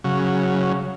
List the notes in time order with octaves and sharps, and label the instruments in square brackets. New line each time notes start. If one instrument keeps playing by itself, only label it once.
[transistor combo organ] C#3 F#3